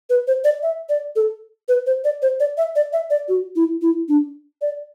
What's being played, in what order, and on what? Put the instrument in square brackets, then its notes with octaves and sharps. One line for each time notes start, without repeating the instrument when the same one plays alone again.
[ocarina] B4
C5
D5
E5
D5
A4
B4
C5
D5
C5
D5
E5
D5
E5
D5
F#4
E4
E4
D4
D5